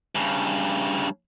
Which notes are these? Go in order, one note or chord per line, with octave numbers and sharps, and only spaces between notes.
G2 C#3